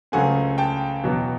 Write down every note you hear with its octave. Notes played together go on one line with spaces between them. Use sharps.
C#2 C#3 F#3 A3 C4 F#5 G#5
G5 A5
E2 B2 F#3 B3